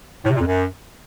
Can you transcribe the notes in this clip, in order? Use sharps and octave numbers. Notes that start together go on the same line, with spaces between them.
A2
C3
A#2
F2
F#2